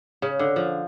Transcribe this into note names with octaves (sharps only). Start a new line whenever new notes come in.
C#3
D3
F3